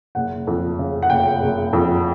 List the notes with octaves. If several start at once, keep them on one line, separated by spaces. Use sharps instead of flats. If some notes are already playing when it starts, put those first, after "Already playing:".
F#1 F#5
F2
C#3
F#5
F#1 G5
F#1
F2